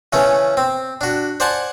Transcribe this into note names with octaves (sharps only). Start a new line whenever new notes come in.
C#3 E3 A3 C#4
C4
D4 F#4
C5 D5 F#5 G#5 A5